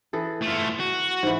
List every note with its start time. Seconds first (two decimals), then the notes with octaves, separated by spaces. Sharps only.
0.13 E3 G#4 A4
0.42 A3 F4
0.80 F#4
1.23 G#2 E3